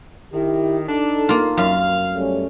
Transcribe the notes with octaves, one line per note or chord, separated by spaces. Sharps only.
D#3 E4 G4
D4 D#4 A4
A#3 F4
F#2 F5
G3 A3 C#4